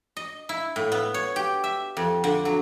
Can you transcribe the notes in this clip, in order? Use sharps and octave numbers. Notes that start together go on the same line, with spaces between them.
D#5
E4
A2
B3
C#5
G4
E5
F2
D3
F#3